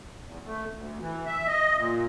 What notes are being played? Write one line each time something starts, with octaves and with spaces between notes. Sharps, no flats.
E2
A3
D2
E3
E5
D#5
A#2